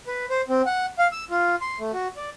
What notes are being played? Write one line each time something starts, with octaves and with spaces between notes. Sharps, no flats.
B4
C5
C4
F#5
F5
E6
F4
C6
A3
F#4
D5